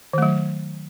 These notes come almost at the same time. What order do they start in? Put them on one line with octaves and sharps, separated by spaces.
D#3 A3 F#3